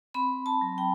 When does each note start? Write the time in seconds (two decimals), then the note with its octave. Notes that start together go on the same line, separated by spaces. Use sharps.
0.14 C4 B5
0.46 A5
0.61 F#3
0.78 G5